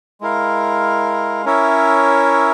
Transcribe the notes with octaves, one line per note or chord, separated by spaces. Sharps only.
G#3 E4 A#4 F5
C#4 E4 A#4 C#5 E5